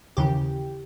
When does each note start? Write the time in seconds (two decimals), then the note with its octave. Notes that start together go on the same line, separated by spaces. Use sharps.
0.17 D#2 C#3 E3 G4